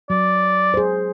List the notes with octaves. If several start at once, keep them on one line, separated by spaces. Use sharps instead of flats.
F#3 D5
G#4 C5